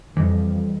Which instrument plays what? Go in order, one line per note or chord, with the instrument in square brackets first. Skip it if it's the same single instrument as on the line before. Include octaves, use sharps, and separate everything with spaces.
[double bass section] F2 [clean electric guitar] E3 G3 D#5